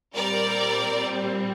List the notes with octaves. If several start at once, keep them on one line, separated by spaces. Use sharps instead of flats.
A#2 G3 C4 A#4 D5